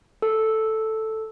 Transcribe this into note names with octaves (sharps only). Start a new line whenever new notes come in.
A4